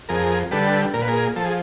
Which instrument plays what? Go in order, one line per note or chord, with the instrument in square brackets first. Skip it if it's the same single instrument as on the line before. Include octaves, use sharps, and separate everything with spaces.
[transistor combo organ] F2 G#4 A#4
D3 G3 A4 B4
A#2 A#4
B4
G#4 A#4
F3 A4
G#4